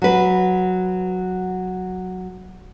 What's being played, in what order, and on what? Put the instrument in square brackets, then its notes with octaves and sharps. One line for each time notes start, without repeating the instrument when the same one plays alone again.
[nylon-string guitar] F#3 B4